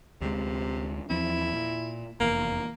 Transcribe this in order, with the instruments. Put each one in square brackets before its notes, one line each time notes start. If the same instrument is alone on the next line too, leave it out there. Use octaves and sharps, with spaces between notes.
[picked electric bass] D2 G#3 [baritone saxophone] C3
[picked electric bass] E2 F3 C4 [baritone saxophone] E4
[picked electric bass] A#2
[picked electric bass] F1 E2 [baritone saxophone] A#3